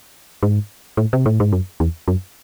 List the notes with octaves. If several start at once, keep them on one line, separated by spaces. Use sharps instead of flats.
G#2
A2
C3
A2
G#2
F#2
E2
F#2